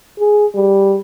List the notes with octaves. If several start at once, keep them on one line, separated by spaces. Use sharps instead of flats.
G#4
G3